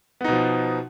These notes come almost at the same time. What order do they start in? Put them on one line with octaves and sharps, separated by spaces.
B3 D#4 B2 F3